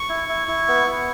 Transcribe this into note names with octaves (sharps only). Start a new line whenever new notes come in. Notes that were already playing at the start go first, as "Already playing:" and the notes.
Already playing: C#6
E4
E4
E4
B3
E4